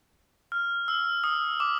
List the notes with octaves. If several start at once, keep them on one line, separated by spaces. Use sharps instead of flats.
F6
E6
D#6
D6